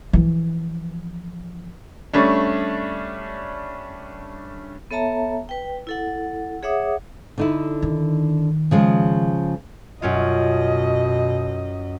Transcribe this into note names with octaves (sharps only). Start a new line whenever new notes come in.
E3 F3
G3 A3 C#4 D4
B3 A4 C#5 E5 A5 A#5
B4 G5
E4 A4 F#5
G#4 C#5 E5 F#5 D6 D#6
D3 D#4 E4
D#3
C#3 F3 G#3
F#2 B2 C#4 F4 D#5